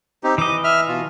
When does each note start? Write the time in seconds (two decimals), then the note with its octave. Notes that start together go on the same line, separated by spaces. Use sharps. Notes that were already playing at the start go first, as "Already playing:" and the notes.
0.23 C4 D#4 G4
0.38 E3 D#5 D6
0.64 E5 F6
0.88 B2 F4